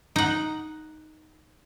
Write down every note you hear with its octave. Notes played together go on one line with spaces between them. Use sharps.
D#4 F#5